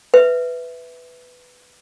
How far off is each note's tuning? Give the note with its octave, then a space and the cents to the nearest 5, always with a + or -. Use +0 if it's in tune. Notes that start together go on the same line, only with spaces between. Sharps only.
B4 +10 E5 +0